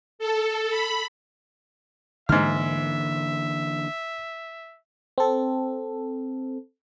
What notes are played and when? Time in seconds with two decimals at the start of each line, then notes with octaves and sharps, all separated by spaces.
0.19 A4
0.70 B5
2.29 G#2 D3 E3 A#3 E5 F6
5.18 C4 A4